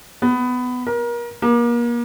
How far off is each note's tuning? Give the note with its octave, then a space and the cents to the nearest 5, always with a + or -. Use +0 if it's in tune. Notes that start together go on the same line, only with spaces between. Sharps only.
B3 +15
A#4 +30
A#3 +35